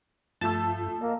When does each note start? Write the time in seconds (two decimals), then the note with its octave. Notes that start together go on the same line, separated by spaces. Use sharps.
0.41 G2 F3 A3 F4 A5 E6
1.01 A#3 D#5